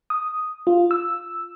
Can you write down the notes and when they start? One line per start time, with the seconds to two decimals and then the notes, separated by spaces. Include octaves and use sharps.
0.10 D#6
0.67 F4
0.91 E6